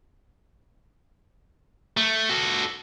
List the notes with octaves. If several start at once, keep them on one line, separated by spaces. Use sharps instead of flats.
A3
F#4 A4